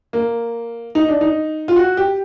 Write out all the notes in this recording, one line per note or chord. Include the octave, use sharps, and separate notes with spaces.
A#3
D#4
D4
D#4
F4
F#4
G4